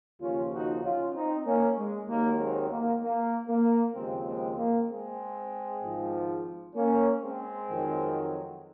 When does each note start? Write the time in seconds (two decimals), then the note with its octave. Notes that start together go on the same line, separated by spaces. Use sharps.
0.21 D#2 C#3 F3 C#4 F4
0.52 D#4 F#4
0.83 C#4 F4
1.15 C4 D#4
1.46 A#3 C#4
1.77 G#3
2.08 D#2 D#3 F#3 A#3
2.39 G#3 C4
2.70 A#3
3.01 A#3
3.48 A#3
3.95 D#2 C#3 F3 G#3 C4
4.26 G#3 C4
4.57 A#3
4.88 G#3 C4
5.82 G#1 G#2 F3
6.75 A#3 C#4
7.22 G#3 C4
7.68 F2 D#3 F#3